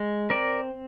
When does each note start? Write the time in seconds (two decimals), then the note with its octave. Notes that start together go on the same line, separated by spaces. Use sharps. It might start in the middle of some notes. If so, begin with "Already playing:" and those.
Already playing: G#3
0.30 C4 A#4 D5